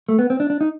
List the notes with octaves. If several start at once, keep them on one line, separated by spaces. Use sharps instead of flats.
A3
B3
C4
D4
D4
D#4